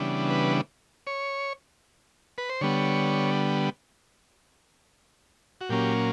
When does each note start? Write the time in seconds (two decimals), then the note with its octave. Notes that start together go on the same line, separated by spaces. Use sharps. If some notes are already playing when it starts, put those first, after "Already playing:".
Already playing: C#3 E3 G3 B3 D4
0.30 B4
1.07 C#5
2.38 B4
2.49 C5
2.61 D3 G3 B3 C#5
5.61 F#4
5.70 A#2 F#3 A#3 C#4 G4